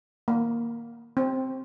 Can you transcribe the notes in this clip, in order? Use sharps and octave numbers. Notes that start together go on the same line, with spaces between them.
A#3
C4